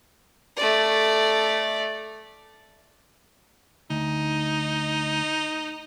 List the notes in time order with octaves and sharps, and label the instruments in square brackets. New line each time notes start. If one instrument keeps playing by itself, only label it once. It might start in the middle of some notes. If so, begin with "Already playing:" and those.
[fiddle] A3 D5
[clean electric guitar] D2 [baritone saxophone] D#4